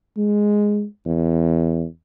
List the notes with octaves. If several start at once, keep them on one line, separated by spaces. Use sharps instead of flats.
G#3
E2